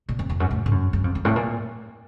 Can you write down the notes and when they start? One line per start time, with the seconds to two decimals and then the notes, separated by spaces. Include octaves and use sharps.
0.09 A#2
0.19 F2
0.30 F2
0.40 F#2
0.51 A2
0.66 A2
0.71 F#2
0.93 F#2
1.04 F2
1.15 F2
1.25 A2
1.36 A#2